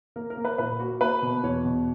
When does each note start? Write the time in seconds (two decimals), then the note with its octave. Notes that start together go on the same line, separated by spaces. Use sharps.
0.16 A#3 A#4
0.30 A#4
0.37 A#3
0.45 B4
0.58 A#2 B4
0.79 A#3 F#4
1.01 A#3 B4
1.22 B2
1.43 E2 C#5
1.65 B2